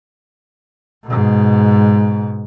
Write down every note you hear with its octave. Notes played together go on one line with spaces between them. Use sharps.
G#2 B2